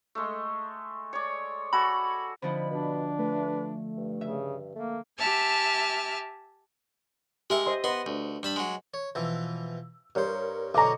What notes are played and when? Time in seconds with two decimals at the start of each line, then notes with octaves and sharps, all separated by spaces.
0.15 G#3 A3
1.13 C#5 D5
1.73 F#4 A4 G#5 B5
2.42 D3 F3 C4 D#4 B5
2.71 B2 D4
3.19 A3 B4
3.97 G2
4.21 C#3 E5
4.75 A3 A#3
5.19 G4 E5 G#5 A5 F6
7.50 G#3 G4 A#4 E5 C#6
7.66 C5 D#5 C6
7.84 B3 B4 D#5 C6
8.06 D2
8.43 G2 A5 B5
8.56 F#3 G#3
8.94 C#5
9.15 B2 E3 F3 E6
10.15 G2 G3 A#4 C5 C#5
10.74 B2 D3 F#3 D#5 A#5 C#6 D6